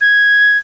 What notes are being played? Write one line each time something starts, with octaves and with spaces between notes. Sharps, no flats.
G#6